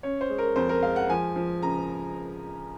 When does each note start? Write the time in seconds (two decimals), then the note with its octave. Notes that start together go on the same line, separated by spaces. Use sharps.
0.03 C#4 C#5
0.21 C5
0.30 G#3
0.38 A#4
0.56 F2 C5
0.69 A#4
0.83 G#3 F5
0.96 F#5
1.09 F3 G#5
1.36 F3
1.62 C#3 A#5